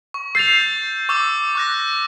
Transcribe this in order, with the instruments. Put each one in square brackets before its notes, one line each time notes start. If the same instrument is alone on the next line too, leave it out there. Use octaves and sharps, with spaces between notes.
[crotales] C#6
[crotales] E6 G6 A6 [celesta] C7 F7
[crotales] C#6 D6 E6
C#6 F#6 A#6